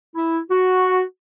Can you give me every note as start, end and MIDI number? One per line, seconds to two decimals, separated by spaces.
0.15 0.39 64
0.50 1.02 66